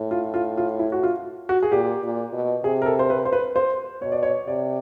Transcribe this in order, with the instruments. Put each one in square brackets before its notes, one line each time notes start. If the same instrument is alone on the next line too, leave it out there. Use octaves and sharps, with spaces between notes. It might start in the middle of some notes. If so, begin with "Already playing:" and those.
Already playing: [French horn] A2
[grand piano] F4
F4
F4
E4
F#4
F4
F#4
G#4
[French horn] A#2 [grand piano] G4
[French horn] A#2
B2
[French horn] C3 [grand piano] G#4
[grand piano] A#4
A4
C5
B4
C5
B4
C5
[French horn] B2 [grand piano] C#5
[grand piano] D5
C#5
[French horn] C3 [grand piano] D5